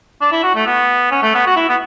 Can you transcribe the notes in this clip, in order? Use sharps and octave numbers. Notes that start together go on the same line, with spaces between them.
D4
E4
F#4
A3
B3
C#4
A3
B3
F#4
E4
B3